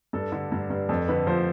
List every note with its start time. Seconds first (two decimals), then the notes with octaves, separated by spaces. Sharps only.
0.13 G2 A4
0.32 D3
0.52 G2
0.70 G2
0.89 F2 A4
1.08 D3 B4
1.27 F3 C5